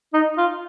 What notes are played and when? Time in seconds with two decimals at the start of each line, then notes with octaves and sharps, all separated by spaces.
0.14 D#4
0.37 F4